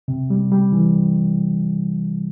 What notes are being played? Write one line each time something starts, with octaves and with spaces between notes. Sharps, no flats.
C3
G3
G3
E3